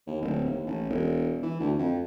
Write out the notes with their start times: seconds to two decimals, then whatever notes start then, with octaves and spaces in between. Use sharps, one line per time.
0.07 D#2
0.22 D1
0.45 D#2
0.67 A1
0.90 E1
1.43 E3
1.60 D2
1.79 F2